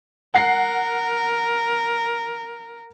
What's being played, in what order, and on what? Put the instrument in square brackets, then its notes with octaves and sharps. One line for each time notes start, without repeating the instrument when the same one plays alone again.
[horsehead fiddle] A#4 [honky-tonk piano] F#5 C7